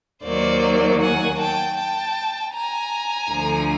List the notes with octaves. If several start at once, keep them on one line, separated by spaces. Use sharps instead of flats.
D#2 D#3 F#3 A#3 C5 D5
F#5 G#5
G5 A5
G5 A5
G#5 A#5
D2 D3 F3